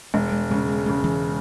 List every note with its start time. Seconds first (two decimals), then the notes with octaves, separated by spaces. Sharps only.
0.14 E1 G#3
0.32 G#3
0.50 C#3 G#3
0.68 G#3
0.86 C#3 G#3
1.04 E3 G#3